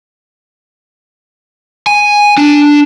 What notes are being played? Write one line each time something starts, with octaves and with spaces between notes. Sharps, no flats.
G#5
D4